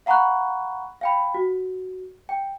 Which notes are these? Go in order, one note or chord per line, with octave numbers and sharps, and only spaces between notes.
F5 F#5 A#5 B5 C#6 F#6
F5 G5 B5
F#4
G5